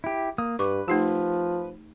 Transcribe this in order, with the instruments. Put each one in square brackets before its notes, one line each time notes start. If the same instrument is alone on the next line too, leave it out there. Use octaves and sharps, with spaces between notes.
[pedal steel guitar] E4 G4
A#3 D#6
[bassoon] G2 [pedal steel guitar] B4 [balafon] C#6 D6
[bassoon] F3 [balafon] A3 D#4 G4